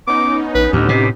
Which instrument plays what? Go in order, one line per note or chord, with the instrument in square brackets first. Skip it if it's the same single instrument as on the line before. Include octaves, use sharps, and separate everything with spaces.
[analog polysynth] B3 C#4 D#4 [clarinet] D6
[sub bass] A#1 [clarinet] B4
[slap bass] D2 [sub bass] A2 [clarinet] G4
[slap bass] C3